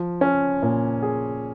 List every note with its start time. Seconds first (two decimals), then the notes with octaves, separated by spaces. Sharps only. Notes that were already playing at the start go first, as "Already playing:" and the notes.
Already playing: F3
0.21 C#4
0.62 A#2
1.02 G#4